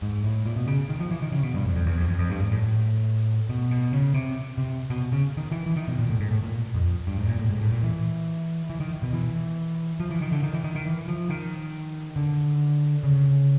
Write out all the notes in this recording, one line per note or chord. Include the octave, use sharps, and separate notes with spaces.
G#2
A2
A#2
B2
C#3
D#3
F3
E3
D#3
C#3
B2
G2
F2
F2
E2
F2
F2
F2
G2
G#2
A2
B2
B2
C#3
C3
C3
B2
C#3
D#3
E3
E3
D#3
B2
A#2
A2
G#2
A2
A#2
F2
G2
G#2
A#2
A2
G#2
A2
A#2
E3
E3
D#3
B2
E3
F3
E3
D#3
D3
D#3
E3
D#3
D#3
E3
F3
D#3
D3
C#3